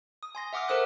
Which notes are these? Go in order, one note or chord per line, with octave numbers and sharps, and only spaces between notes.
D#6
G#5 C6 A#6
E5 F#5 D6 D#6 F6
A4 A#4 C5 D#6 F#6